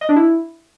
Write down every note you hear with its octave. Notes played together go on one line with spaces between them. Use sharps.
D#5
D4
E4